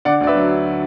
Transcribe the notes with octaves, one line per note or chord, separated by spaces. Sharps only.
D3 D5 F#5
D2 D5
B4 E5
F#3